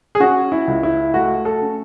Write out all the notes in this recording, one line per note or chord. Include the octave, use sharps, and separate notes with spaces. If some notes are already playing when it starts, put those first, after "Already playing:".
G#4
C#4 F#4
E4
C#2
E4
A3 F#4
A4
C#4